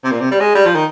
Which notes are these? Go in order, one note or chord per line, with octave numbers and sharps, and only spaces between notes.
C3
A#2
C3
G3
G#3
G3
F3
D#3